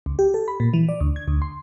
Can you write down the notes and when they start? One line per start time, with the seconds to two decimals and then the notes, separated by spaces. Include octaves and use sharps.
0.06 C#2
0.19 G4
0.34 A4
0.48 B5
0.60 A#2
0.74 E3
0.89 D5
1.01 D2
1.16 G#6
1.28 D2
1.42 C6